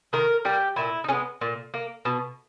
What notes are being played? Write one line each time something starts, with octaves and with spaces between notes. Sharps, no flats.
D#3 A#4
G3 A#3 G4
A#2 E4
D#4
G#3 B3 C#4
A#2
A#3
B2